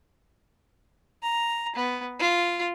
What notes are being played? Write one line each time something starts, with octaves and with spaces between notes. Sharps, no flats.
A#5
B3
F4